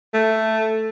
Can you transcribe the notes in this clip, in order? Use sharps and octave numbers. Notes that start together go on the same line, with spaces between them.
A3